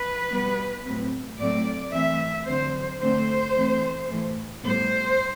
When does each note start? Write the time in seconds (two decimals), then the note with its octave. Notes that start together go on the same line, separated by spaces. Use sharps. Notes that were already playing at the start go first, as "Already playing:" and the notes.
Already playing: B4
0.31 B2 G3 B3
0.85 A2 F#3 C4
1.39 A2 F#3 A3 C4 D5
1.92 E3 A3 C4 E5
2.46 D3 F#3 C4 C5
3.01 D3 A3 C4 C5
3.55 E3 A3 C4
4.10 A2 E3 A3
4.63 A2 G3 B3 C5